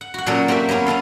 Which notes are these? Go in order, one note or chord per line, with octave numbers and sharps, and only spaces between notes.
F#5
F#4 F#5
A#2 F#3 A#3 C#4 A4
A#3 C4 F#4 G4 E5
F#3 A#3 B3 C#4
B3 C#4 A4 F5